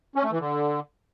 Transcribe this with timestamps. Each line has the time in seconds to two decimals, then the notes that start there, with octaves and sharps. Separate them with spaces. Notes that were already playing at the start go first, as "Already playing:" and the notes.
0.16 C#4
0.24 A3
0.32 E3
0.40 D3